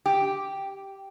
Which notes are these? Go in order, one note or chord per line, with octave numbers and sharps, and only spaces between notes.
G4